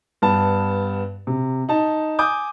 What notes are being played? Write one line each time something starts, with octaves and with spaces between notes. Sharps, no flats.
G2 B3 A5
C3
D#4 A5
G#5 D6 D#6 G6